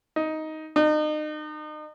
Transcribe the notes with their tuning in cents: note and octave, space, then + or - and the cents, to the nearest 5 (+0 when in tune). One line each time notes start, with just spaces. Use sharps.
D#4 +10
D#4 -35